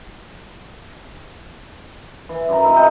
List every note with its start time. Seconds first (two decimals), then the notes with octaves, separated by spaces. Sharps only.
2.29 E3
2.49 F#2 A#5
2.64 D#4 E4
2.76 D#4 F5 G5